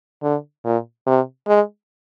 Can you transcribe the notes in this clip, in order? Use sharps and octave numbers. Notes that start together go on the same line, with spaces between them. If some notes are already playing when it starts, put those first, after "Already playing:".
D3
A#2
C3
G#3